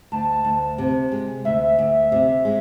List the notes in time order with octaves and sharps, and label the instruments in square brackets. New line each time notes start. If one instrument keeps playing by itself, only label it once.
[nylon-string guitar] D2 [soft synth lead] A5
[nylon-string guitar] D2
C3
G#3
[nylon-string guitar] D2 [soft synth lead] E5
[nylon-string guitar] D2
C3
G#3